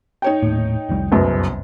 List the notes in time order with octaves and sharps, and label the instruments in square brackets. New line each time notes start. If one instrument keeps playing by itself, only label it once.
[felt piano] D#4 C#5 G5
[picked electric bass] D#1 A2
F1 C2 G3
[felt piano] F#1 F#2 B2